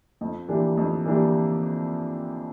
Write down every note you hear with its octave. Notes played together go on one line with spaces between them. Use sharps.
F2
E3 A#3 D4 G4
F2
E3 A#3 D4 G4